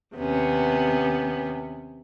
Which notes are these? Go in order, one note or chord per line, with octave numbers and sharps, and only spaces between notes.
D#2 C3 B3 C#4